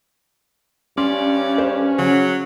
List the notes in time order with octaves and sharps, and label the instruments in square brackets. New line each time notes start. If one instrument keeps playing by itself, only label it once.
[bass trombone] G2 [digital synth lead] C#4 [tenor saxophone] D5 [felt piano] C6
[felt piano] C5
[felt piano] C#3 [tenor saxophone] F#3